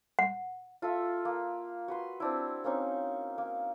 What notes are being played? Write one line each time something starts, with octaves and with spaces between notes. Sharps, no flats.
F#5
F4 A4 E5 F5
A#3
F#4 B4 C6
C4 D4 E4
A#3 C4 C#4 D#4
A#3